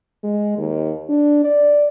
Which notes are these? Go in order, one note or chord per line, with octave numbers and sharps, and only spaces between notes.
G#3
D#2
D4
D5